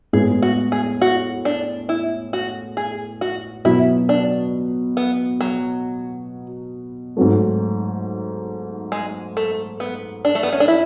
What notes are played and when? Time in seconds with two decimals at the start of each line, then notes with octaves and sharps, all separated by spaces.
0.13 A2 G#3 B3 G#4
0.42 F#4
0.72 G#4
1.02 F#4
1.45 D4
1.89 E4
2.33 F#4
2.77 G#4
3.21 F#4
3.65 B2 F#3 B3 E4
4.09 D4
4.97 B3
5.41 F#3
7.17 G#2 F#3 A3
8.92 G#3
9.37 A3
9.80 B3
10.25 D4
10.35 A3
10.43 B3
10.53 C#4
10.60 D4
10.68 E4